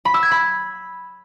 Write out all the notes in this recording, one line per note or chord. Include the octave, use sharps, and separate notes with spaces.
B5
E6
G#6
B5